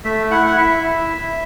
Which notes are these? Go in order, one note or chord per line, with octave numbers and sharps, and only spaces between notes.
A3 E5
E4 F#5
F#5
E4 E5
E4